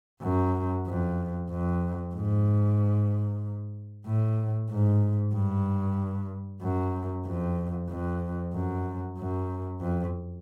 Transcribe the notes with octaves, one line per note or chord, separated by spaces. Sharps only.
F#2
F2
F2
G#2
A2
G#2
G2
F#2
F2
F2
F#2
F#2
F2